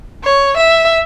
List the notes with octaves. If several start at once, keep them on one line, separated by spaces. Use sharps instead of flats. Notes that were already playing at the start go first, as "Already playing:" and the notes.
C#5
E5